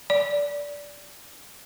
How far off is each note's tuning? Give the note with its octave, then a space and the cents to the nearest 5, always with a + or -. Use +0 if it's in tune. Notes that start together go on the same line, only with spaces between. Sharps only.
D5 -15